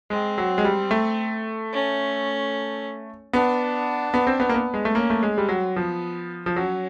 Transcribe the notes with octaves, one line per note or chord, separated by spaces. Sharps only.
G#3 C4
F#3
G#3
G3
A3
C#4
B3 D4
B3
C4
B3
A#3
B3
G#3
A3
A#3 C#4
A3
G#3
G3 C4
F#3
F3 B3
F3
F#3 C#4